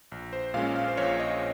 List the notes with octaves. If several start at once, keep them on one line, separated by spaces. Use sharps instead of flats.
A#1
C5
A#2 G#3 C#4 F5
F5
C5
A#1 C#5
D#5